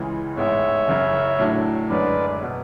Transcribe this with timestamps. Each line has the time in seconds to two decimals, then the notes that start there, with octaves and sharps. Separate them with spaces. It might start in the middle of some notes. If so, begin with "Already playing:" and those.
Already playing: C#2 C#3 E3 G#3
0.37 A1 G#2 G#3 B3 C#5 E5
0.88 F#1 F#2 C#3
1.39 A2 F#3 A3 D4
1.90 F#2 D3 G#3 C#4 B4 D5
2.42 B2